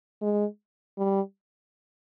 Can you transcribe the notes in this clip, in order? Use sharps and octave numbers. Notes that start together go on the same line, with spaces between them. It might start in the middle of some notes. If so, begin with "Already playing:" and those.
G#3
G3